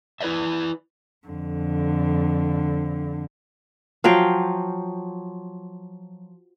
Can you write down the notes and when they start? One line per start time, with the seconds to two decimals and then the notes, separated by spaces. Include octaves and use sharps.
0.21 E4 B4 C5 D5 E5
1.27 F2 D3
4.04 F3 F#3 F5 G5